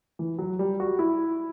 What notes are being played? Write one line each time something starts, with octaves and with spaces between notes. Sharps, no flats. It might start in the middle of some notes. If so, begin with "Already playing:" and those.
E3
F#3
G3
F#4
E4